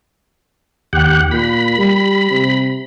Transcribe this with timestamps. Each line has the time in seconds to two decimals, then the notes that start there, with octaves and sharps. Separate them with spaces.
0.93 D#2 G4 F#5
1.31 A#2 B5
1.78 G3
2.31 C3